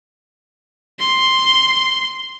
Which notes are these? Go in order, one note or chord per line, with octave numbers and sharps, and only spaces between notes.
C6